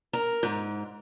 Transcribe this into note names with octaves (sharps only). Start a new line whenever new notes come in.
A#4
G#2